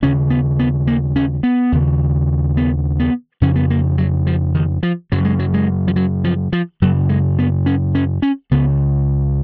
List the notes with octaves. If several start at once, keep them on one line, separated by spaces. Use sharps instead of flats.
D#2 C#3 C#4
B3
B3
A#3
C#4
B3
D#2 C#3
B3
B3
F2 C#3 C#4
B3
A#3
F#3
F3
D#3
F3
F#2 C#3 F#3
G#3
F#3
G#3
F3
F#3
F3
F3
F#2 C#3 F#3
G#3
B3
C#4
C#4
C#4
C#2 C#3 B3